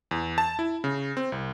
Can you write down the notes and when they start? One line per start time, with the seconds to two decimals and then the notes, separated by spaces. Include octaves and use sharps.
0.11 E2
0.38 A5
0.59 E4
0.84 C#3
1.17 C4
1.32 C2